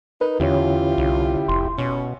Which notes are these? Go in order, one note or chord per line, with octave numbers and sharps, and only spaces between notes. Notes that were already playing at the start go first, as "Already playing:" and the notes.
D#4 A#4 B4
E2 D3 C#4 E4 F4 G4 C#5
C2
F1 C6
B2 C#4